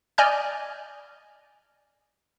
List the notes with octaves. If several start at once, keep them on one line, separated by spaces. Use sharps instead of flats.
D5 D#5 G#5 F6 G6